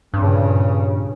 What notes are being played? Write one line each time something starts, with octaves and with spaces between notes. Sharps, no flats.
G2 A#2 C#3